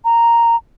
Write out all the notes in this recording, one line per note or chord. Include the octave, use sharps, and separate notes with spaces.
A#5